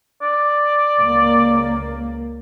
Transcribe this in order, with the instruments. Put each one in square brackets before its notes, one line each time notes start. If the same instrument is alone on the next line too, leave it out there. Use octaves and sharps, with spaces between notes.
[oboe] D5
[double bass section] C#2 A#3